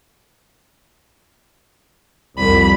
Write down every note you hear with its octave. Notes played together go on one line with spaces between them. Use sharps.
C2 F2 B5